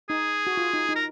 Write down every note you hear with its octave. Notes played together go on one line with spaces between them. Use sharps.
D#4 G#4
F#4
F4
D#4
D#4
A#4